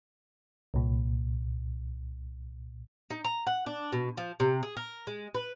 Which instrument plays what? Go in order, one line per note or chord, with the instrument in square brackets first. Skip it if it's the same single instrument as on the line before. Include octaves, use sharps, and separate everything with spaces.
[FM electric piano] C2 A#2
[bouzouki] D#4
A#5
F#5
D4
B2
F3
C3
G#4
A#4
G#3
B4